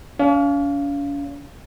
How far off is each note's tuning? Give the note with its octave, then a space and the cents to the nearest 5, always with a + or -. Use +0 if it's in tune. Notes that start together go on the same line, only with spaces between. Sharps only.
C#4 +45 F5 -15